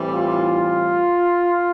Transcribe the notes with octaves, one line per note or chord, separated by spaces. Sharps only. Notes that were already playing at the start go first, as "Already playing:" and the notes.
Already playing: A2 E3 G3 C4
F4